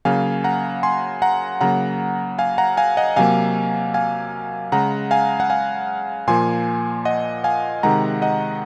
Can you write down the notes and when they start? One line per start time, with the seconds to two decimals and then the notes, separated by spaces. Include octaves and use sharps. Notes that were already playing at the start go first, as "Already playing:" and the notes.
0.05 C#3 F#3 A#3 F5 G#5
0.44 F#5 A#5
0.83 G#5 C6
1.22 F#5 A#5
1.61 C#3 F#3 A#3 F#5 A#5
2.39 F5 G#5
2.58 F#5 A#5
2.77 F5 G#5
2.97 D#5 F#5
3.16 C3 F#3 A#3 F5 G#5
3.94 F5 G#5
4.72 C#3 G#3 F#5 A#5
5.11 F5 G#5
5.40 F#5
5.50 F5 G#5
6.28 A#2 F3 A#3 G#5 C6
7.05 D#5 F#5
7.44 F5 G#5
7.83 C3 D#3 G#3 F#5 A#5
8.22 D#5 F#5